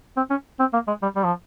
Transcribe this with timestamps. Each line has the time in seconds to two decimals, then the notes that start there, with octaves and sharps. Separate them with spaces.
0.17 C4
0.30 C#4
0.59 C4
0.73 A#3
0.87 G#3
1.02 G3
1.16 G3
1.24 F3